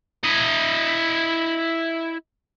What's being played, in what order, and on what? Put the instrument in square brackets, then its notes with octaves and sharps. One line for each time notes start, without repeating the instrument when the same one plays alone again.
[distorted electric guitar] E4 D#5